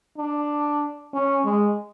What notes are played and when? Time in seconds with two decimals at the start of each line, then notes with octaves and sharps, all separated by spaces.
0.18 D4
1.14 C#4
1.45 G#3